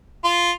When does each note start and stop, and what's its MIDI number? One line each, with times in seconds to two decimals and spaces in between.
0.24 0.52 65